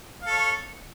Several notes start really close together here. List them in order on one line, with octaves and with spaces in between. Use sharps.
F5 A4 C#5